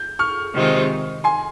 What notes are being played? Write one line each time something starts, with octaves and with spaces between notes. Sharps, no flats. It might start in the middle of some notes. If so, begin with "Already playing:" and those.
Already playing: G6
C#6 F6
C3 D#3 G#3 C4 F4
G#5 C6